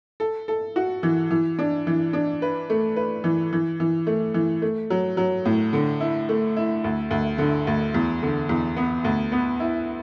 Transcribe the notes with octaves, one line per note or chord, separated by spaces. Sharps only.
A4
A4
F#4
E3
E3
D4
E3
D4
B4
A3
B4
E3
E3
E3
A3
E3
A3
F#3
F#3
A2
D3
E4
A3
E4
D2
D2
D3
D2
E2
D3
E2
B3
D2
B3
E4